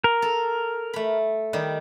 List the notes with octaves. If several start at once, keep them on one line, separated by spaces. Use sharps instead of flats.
A#4
A4
A3 B5
D#3 G3